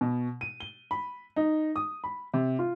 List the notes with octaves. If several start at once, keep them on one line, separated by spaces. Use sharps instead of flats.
B2
D#7
G7
B5
D#4
D#6
B5
C3
F4